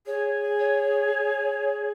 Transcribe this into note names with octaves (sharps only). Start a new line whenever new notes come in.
G#4 C#5
C#5